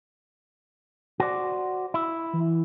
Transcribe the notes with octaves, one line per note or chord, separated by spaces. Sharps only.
F#4 C5 D5
E4
E3